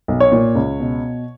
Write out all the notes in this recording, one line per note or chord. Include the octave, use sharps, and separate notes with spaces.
B1
C#5
A#2
C#2
B2